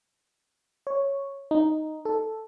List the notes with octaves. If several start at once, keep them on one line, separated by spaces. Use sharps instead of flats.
C#5
D#4
A4